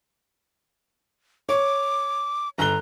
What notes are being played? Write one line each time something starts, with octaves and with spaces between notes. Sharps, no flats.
C#5 D6
G1 A#5 F#6 G7